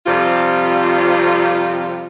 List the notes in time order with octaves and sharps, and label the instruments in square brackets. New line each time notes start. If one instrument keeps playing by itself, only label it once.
[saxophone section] F2 C3 G3 F4